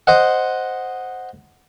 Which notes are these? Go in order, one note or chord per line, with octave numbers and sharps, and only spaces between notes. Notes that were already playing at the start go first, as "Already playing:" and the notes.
C5 D#5 F#5